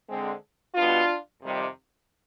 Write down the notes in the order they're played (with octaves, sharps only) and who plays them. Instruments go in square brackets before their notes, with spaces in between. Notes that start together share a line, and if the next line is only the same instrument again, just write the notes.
[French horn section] D3 G#3 C4
B2 G3 B3 D4 F4
F2 C3 D#3 G3